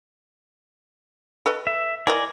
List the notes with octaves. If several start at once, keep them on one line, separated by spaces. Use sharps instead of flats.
A4 B4 D#5
E5
E3 A#4 D5 D#5 G#5